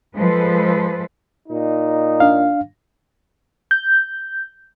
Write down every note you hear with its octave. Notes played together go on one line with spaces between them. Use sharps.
F3 G#3 A4 B4 C5
A#2 D#4
D4 F5
G6